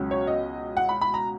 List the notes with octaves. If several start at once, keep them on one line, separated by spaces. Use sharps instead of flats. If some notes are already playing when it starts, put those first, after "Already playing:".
Already playing: C#2 B2 F#3 C#4
C#5
D#5
F#5
B5
B5
A#5